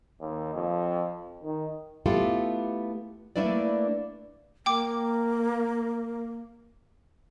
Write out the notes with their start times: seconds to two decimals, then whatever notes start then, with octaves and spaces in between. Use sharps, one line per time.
0.21 D#2
0.54 F2
1.43 D#3
2.06 A3 B3 E4 F4 G4 A4
3.36 A3 A#3 D4 E4 B4 D5
4.66 A#3 G5 D6